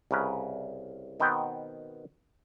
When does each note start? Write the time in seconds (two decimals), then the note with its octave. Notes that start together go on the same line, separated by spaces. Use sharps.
0.11 C2 C#3 A#4 B4
1.20 B2 D#3 B3 C4 G5